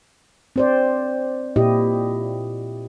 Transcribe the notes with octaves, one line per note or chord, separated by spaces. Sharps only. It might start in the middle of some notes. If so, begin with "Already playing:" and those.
C4 C5 D5
A#2 E4 G4 D#5